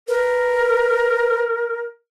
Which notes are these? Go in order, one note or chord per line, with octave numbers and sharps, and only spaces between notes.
A#4 B4